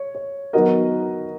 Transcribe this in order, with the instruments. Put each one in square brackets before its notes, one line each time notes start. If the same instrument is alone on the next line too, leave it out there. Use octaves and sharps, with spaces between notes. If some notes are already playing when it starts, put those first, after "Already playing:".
Already playing: [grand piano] C#5
C#5
[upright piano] F#3 B3 D#4 F#4 A#4 [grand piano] D#5